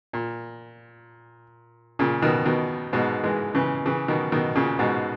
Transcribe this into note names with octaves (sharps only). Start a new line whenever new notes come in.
A#2
A#2 C#3
B2 D#3
B2 D#3
G#2 B2
E3 G#3
C#3 E3
C#3 E3
B2 D#3
B2 D#3
A#2 C#3
G#2 B2